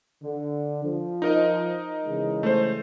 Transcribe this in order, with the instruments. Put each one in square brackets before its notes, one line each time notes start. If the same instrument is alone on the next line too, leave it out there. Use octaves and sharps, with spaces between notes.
[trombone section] D3
F3
[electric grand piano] D#4 A#4 D#5
[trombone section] C#3 E3 G#3
[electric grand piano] A3 C5